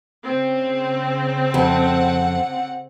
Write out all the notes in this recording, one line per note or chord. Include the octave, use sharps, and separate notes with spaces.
C#3 C4
F2 F#5